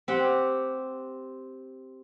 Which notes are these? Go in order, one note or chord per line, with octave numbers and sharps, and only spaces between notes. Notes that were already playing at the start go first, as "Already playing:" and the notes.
C4 G4 F#5